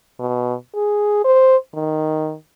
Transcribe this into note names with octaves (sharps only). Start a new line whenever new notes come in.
B2
G#4
C5
D#3